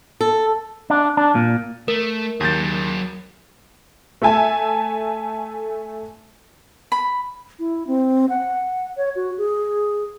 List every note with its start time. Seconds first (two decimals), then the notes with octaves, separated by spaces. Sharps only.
0.21 A4
0.90 D4
1.17 D4
1.35 A#2
1.88 A3 A#4
2.41 D#2 F#3 G#4 G6 A6
4.22 A3 A4 E5 G#5 A5
6.92 B5
7.59 E4
7.87 C4
8.29 F#5
8.97 C#5
9.16 F#4
9.38 G#4